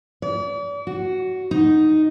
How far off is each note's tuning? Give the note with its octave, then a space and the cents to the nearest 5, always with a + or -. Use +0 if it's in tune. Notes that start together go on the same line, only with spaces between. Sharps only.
D5 -40
F#4 +5
D#4 +0